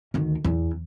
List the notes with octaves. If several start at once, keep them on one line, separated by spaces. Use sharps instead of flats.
D2 D#3
E2